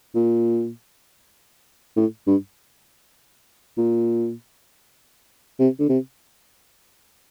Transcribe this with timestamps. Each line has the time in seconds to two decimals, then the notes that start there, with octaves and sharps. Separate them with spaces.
0.15 A#2
1.96 A2
2.27 G2
3.78 A#2
5.59 C3
5.79 D3
5.89 C3